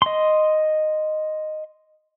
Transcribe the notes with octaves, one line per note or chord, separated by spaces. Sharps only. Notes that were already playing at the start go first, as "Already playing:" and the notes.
D#5 C6